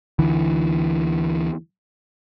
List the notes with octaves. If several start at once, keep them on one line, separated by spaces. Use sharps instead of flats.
D2 D3 E3